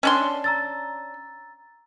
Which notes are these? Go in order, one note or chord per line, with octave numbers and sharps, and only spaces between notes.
C#4 D4 C6
A#5 E6 A6